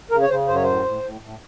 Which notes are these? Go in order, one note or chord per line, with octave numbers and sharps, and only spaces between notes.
C#3 A#4
C#5
C#3 C5
F#2 C5
C#5
A2 C5
A2
A2
A2